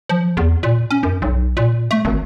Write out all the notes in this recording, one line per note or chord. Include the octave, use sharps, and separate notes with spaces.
F3
E2
A#2
C#4
F#2
B1
A#2
A3
G#1